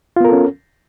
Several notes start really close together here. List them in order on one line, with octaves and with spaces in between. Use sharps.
F4 B3 A#4 A4 C#4